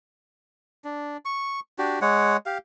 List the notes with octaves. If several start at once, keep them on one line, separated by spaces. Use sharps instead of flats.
D4
C#6
D4 F#4 G4
G#3 C#5 F#5
G4 F5